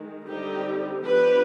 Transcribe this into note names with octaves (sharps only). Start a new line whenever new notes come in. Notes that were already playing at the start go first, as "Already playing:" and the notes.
Already playing: D#3 G#3
D3 G3 C4 D#4 G4
F3 B3 D4 G4 B4